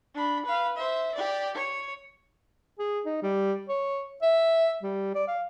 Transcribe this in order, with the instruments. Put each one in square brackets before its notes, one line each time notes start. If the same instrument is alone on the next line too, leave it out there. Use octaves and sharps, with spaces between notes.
[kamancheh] D4 B5
B4 F5
C5 E5
G4 D5
C#5
[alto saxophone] G#4
D#4
G3
C#5
E5
G3
D5
F5